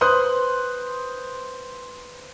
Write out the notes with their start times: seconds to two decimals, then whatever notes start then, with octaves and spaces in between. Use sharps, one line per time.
0.01 B4 C5 C6 D#6 F#6